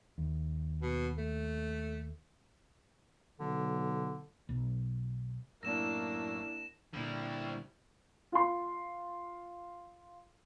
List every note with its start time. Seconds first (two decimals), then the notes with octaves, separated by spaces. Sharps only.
0.18 D#2
0.82 B2
1.18 A3
3.40 B1 D3
4.49 B1
5.63 F#2 A2 A#3 D4 E4 E6 A#6 E7
6.93 A#2 D3 G3 E4
8.32 F4 C6